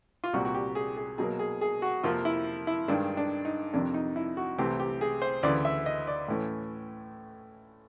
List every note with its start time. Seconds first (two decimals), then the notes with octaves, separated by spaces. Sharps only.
0.24 F4
0.33 C2 A#2 G3 F#4
0.45 F#4
0.55 G4
0.75 G#4
0.97 G#4
1.18 B2 F#3 A#3 G#4
1.39 G#4
1.61 G#4
1.82 F#4
2.03 F2 C3 F3 A#3 F4
2.25 E4
2.67 E4
2.88 G2 D#3 G#3 D4
3.17 D4
3.45 D#4
3.73 F2 C3 D#3 D4
3.94 D#4
4.16 E4
4.37 F#4
4.58 C2 C3 E3 A3 C4 G4
4.80 G4
5.01 G#4
5.22 C5
5.43 D2 C#3 E3 D5
5.65 E5
5.86 D#5
6.07 D5
6.28 A2 E3 A3 C#4